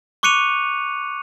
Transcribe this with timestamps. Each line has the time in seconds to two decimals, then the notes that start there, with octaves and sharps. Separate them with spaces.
0.23 C#6 D6 F#6 C#7 D#7 F7